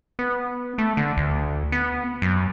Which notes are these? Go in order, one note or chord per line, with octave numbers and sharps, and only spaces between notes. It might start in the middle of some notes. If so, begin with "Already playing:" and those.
B3
A3
D3
D2
B3
F#2